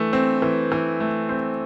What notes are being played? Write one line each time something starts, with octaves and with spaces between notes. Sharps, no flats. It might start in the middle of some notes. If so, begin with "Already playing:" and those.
Already playing: E3 A3
C4
E3
E3
A3
C4 C5